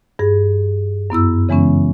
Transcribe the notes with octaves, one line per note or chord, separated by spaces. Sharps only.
G2 G#4
F#2 B3 E4 E6
C#3 E3 G#3 B3 C#4